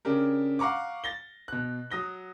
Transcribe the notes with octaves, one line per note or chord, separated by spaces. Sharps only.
C#3 C#4 D4 G4 A#4
F5 F#5 A#5 C#6 D6
A6 A#6 G7
B2 F#6
F#3 D#6 A#6 G7